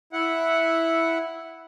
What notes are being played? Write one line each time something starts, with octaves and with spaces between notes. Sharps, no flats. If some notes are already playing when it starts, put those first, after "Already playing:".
E4 F#5